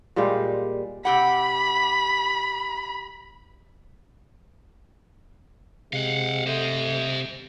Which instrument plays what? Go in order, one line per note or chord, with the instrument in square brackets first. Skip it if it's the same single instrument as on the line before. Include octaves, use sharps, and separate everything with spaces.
[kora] A#2 G3 G#3 F5
[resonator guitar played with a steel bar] C3 G4 F#5 [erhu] B5
[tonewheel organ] C3 [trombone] G#3 [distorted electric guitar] F5 F#5
[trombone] A3 [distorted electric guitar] C5 D#5